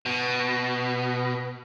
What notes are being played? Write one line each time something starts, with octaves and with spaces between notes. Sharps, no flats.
B2